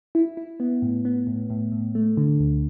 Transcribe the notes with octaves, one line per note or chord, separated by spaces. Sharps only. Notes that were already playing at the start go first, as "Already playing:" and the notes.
E4
E4
B3
A2
B3
A2
A2
A2
A3
D3
D2